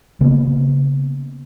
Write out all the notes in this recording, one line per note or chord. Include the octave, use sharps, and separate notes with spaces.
C#3 A#3 B3